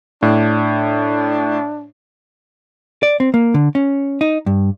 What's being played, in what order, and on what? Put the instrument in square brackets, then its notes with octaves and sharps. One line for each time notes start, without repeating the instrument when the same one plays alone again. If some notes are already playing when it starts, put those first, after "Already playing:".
[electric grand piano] A2 [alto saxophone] D4
[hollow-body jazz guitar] D5
C4
A#3
D3
C#4
D#4
G2